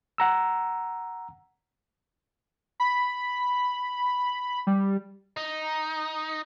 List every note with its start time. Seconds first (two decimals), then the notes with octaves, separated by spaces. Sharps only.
0.18 F#5 A#5 E6
2.80 B5
4.67 G3
5.37 D#4